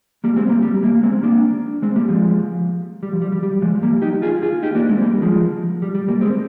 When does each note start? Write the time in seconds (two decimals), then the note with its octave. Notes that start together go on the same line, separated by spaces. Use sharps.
0.24 G3 A#3
0.36 G#3 C4
0.49 G3 A#3
0.63 G3
0.83 G3 A#3
0.95 A#3
1.03 G#3 C4
1.23 A#3 D4
1.82 G#3 C4
1.95 G3 A#3
2.09 F3 G#3
3.03 G3
3.13 F3
3.22 G3
3.32 G3
3.43 G3
3.62 F3 G#3
3.83 G3 A#3
4.02 D#4 G4
4.22 F4 G#4
4.43 F4 G#4
4.63 D#4 G4
4.75 A#3 D4
4.89 G#3 C4
5.02 G3 A#3
5.22 F3 G#3
5.82 G3
5.95 G3
6.08 G3 A#3
6.21 G#3 C4